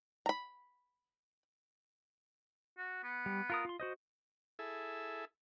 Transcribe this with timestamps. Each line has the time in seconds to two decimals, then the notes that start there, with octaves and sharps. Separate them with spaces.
0.26 A#5 B5
2.78 F#4
3.04 B3
3.26 G3
3.50 F4 A#4 D#6
3.65 F4 C6
3.80 F#4 C5 D#5
4.59 E4 G#4 A4 E5